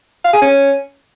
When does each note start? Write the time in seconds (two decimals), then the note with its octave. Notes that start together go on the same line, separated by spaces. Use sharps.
0.24 F5
0.33 G#4
0.42 C#4